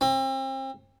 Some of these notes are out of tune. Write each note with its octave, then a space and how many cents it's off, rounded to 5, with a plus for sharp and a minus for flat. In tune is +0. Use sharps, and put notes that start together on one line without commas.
C4 +35